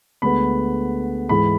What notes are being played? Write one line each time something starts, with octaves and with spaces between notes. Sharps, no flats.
D2 D3 G#3 B3 B5
G#2 E3 G#3 B5